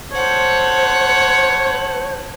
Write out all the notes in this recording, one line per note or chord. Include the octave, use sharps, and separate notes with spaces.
A4 C5 C#5 F#5